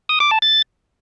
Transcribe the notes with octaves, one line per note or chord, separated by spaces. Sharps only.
D#6
D6
A5
A6